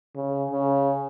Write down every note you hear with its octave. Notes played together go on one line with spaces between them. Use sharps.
C#3
C#3